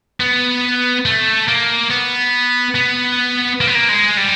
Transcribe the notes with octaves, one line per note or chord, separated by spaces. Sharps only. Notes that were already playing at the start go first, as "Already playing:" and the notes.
B3
A3
A#3
B3
B3
A#3
B3
A#3
G#3
G3